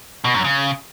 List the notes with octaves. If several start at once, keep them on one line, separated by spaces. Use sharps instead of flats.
B2
F#2
C#3